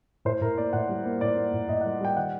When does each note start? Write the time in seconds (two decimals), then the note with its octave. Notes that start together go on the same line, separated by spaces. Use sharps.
0.25 A2 C5
0.41 A2 A#4
0.57 A#3 D5
0.73 A2 F#5
0.89 G3
1.05 A#3
1.21 A2 D5
1.37 A#3
1.53 A2
1.69 A2 D#5
1.81 G3 F#5
2.01 G3 G5
2.16 D#3 F#5